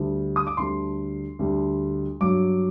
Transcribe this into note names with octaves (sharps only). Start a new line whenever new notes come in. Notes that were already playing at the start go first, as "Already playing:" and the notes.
Already playing: D2 D3 G3
D#6
D6
D2 D3 G3 C6
D2 D3 G3
G2 F#3 D6